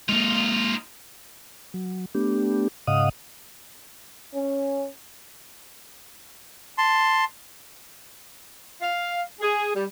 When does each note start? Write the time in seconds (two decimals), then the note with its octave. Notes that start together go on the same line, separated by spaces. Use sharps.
0.09 G#3 A#3 D#4 F4
1.74 F#3
2.15 A3 B3 D4 G4
2.87 G#2 C#3 D#5 F5 F#5 D#6
4.33 C#4
6.78 A5 C6
8.80 F5
9.41 G#4
9.74 G3